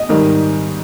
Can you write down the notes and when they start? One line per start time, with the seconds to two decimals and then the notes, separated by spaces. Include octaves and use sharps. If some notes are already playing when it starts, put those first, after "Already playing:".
Already playing: D#5
0.09 G#2 D#3 G3